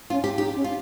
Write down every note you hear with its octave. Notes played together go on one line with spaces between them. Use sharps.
C#4 F4
G4
D#4 G4
C#4
F4